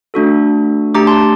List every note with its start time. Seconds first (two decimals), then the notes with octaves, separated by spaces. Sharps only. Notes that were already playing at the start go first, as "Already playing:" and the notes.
0.14 A3 D4 F#4 A4
0.95 A3 D4 G4 A#5 D6
1.07 A5 C6